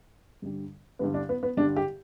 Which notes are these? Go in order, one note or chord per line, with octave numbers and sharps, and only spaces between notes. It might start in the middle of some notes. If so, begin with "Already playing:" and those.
G2 D3 G3
G2 D3 G3 B3
D4
B3
B3
G2 D3 G3 D4
G4